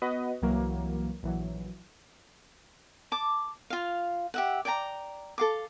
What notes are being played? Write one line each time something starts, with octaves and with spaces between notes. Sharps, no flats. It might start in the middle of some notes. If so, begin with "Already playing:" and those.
B3 F#4 B4 D#5
C2 E3 F#3 A#3
A#1 E3 F#3
A5 D6
F4 F5
G4 E5 F#5
D5 G5 G#5 A#5
A4 F5 D6